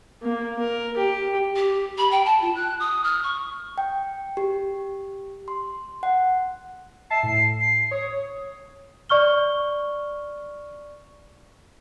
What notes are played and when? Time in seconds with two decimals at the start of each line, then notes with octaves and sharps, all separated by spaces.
0.22 A#3
0.59 A#4
0.97 G4
1.56 G4
1.98 B5
2.11 G5
2.25 A5
2.42 F4
2.55 F#6
2.80 D#6
3.04 F6
3.23 C#6
3.78 G5
4.37 G4
5.48 C6
6.03 F#5
7.10 E5 A5 C7
7.23 A2
7.60 C7
7.91 C#5 D#6
9.09 D5 C#6 F6 G7